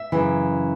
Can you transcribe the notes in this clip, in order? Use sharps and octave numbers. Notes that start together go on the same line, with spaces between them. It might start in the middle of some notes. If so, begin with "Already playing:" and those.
Already playing: E5
F#2 C#3 E3